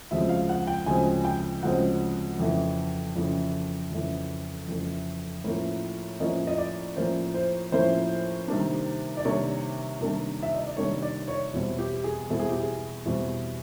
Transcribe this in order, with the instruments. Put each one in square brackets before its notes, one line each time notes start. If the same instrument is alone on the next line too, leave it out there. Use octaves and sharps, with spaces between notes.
[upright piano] D2 C#3 F3 G#3 C4 E5
F5
F#5
G5
D2 C#3 F3 G#3 C4 G#5
G5
D2 C#3 F3 G#3 C4 F#5
F2 C#3 E3 A3
F2 C#3 E3 A3
F2 C#3 E3 A3
F2 C#3 E3 A3
A2 F3 A#3 C#4 E4
A2 F3 A#3 C#4 E4 D#5
D#5
D5
A2 F3 A#3 C#4 E4 C5
C5
A2 F3 A#3 C#4 E4 C5
C3 D#3 G3 A#3 D4
D5
C3 D#3 G3 A#3 D4 C#5
C3 D#3 G3 A#3 D4
E5
D#5
D5
C3 D#3 G3 A#3 D4 C#5
D5
C#5
E2 B2 G3 C4 E4
G4
G#4
E2 B2 G3 C4 E4 A4
G#4
G4
G#4
E2 B2 G3 C4 E4